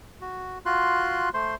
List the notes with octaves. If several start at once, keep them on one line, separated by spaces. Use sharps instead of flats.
F#4
F4 F#4 C6 F#6
A3 C5 C6